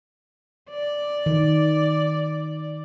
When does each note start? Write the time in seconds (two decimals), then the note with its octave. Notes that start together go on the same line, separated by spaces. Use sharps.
0.70 D5
1.26 D#3